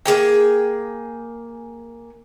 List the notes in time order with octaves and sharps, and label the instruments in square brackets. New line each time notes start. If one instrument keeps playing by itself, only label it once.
[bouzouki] A#3 B3 G#4 G5